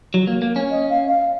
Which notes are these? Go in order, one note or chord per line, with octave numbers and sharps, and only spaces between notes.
F#3
A#3
A#3
C#4
D#5
F5
F5